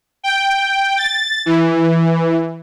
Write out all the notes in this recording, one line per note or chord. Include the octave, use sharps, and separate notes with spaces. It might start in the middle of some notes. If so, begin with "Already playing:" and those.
G5
A6
E3